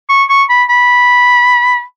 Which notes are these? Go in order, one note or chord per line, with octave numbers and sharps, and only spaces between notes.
C#6
C#6
B5
B5